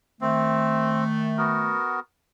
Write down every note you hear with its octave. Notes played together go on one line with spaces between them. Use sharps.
D#3 A3 C4
B3 F#4 A#4